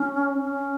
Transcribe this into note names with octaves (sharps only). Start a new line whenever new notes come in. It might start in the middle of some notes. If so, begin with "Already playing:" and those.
Already playing: C#4
C#4